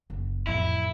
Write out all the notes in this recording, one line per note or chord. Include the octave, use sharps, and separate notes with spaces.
F#1
A1 F2 E4